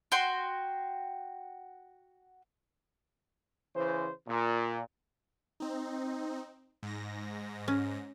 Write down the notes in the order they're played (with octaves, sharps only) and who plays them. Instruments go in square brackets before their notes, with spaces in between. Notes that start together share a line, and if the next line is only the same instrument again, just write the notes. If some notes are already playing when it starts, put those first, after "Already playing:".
[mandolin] F#4 G5 C6
[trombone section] C#3 E3 C5
A#2
[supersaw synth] C4 D#4
G#2 A#6
[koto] C#4